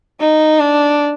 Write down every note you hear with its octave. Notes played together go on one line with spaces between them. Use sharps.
D#4
D4